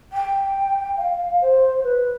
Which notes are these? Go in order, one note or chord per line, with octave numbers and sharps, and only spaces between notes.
G5
F5
C5
B4